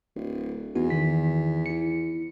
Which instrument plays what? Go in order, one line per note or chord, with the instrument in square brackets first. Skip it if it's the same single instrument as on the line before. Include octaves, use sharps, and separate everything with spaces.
[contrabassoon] D1
[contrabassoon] E2 [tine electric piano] B3 D#4 F#4
[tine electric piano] D#3 B6
E4 C#7